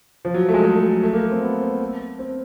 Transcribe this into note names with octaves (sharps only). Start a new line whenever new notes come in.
F3
F#3
A3
G#3
A3
A3
A#3
C4
B3
C4
C4